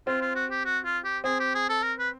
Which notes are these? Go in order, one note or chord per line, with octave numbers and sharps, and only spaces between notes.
C4 F4
F4
F#4
G4
F#4
F4
G4
C4 G#4
G4
G#4
A4
A#4
B4